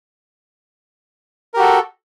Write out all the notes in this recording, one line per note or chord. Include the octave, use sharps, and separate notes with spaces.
F#4 G4 A4 A#4